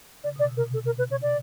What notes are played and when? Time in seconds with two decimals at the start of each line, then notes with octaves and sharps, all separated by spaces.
0.24 C#3 D5
0.36 B2 D5
0.49 C3
0.57 A#4
0.61 B2
0.74 A4
0.86 A#4
0.99 B4
1.11 C#5
1.22 D5